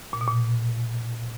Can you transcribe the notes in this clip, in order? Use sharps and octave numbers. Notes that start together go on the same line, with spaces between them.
A#2
B2
A#2